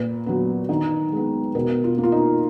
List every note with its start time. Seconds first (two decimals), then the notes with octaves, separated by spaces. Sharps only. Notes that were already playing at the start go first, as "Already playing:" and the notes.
Already playing: A#2 B4
0.26 F#3 B3
0.69 D#3
1.12 G#3 B3
1.55 B2 A#4
1.84 F4
1.98 A#3
2.03 F4
2.12 D#4